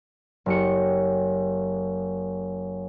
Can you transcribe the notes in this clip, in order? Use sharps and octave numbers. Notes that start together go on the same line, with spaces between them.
F#1 G4 C#7